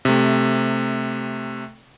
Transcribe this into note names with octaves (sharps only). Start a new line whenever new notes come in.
C3 A3